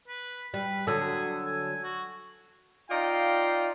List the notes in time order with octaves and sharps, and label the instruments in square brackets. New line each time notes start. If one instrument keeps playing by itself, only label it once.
[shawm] B4
[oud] G3 [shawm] B4
[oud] D3 F#3 [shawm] G#4 [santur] A4
[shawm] G#5
F#4
[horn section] D#4 F4 D5 D#5 F5 G5